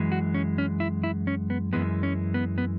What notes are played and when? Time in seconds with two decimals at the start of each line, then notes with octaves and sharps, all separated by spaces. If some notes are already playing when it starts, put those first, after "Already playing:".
Already playing: F#2 E3 G#3
0.12 F#4
0.34 C#4
0.58 C#4
0.80 E4
1.04 E4
1.27 C#4
1.50 B3
1.73 F#2 E3 G#3 B3
2.03 C#4
2.34 B3
2.58 B3